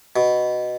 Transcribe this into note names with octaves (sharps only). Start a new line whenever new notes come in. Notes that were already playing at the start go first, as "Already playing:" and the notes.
B2